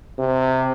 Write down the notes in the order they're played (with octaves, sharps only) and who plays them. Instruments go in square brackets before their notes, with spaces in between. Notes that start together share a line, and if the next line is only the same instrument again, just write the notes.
[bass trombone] C3